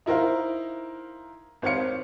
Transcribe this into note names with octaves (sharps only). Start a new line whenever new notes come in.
D#4 E4 A#4 C5 F5
G#1 C5 C#5 F5 C#7